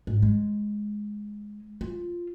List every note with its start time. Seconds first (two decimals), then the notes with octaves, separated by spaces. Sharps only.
0.07 G#2
0.22 G#3
1.81 F4